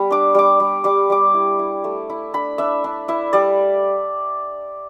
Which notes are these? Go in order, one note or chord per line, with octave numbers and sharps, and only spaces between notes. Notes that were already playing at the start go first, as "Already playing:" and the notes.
Already playing: G3 B3 B5
D4 D6
G3 D6
G3
G3 D6
G3 D6
E4
E4
A3
E4
D4 B5
D4 E5
D4
E4 E5
G3 D5